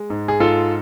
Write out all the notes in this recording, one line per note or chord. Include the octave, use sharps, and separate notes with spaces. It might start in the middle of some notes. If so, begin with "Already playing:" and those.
Already playing: G#3
G#2
G#4
G#2 F4 A4